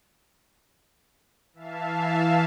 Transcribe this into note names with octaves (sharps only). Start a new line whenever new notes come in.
E3 E5 F5 A5